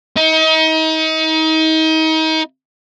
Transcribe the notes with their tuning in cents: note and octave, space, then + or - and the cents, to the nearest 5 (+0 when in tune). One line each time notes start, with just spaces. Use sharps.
D#4 +35